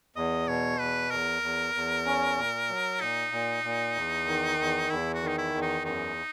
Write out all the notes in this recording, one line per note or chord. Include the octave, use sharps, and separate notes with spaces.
E2 D#5
B2 C#5
E2 B4
E2 A#4
E2
E2
C#4
A#2
F#3
A#2 D#4
A#2
A#2
E2
D#3
E2
E2 E4
F#4
D#3 D#4
E4
E2
D#4
F#2 D#4